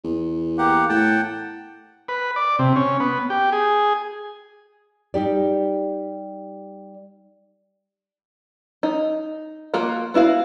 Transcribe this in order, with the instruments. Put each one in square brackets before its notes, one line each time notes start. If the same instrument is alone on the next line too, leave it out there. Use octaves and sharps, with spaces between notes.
[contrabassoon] E2
[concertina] A#3 G4 F#5
[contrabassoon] A2 [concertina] F#5 G5 A5
[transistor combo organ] B4
D5
C3
C#4
B3
G4
G#4
[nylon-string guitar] G3 D#4 G4 D5
[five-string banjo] D#4
A#3 F4 F#4 F#5
B3 E4 F#4 F5